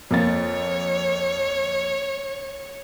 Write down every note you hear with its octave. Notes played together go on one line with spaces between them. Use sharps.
F2 A#3 C#5 A6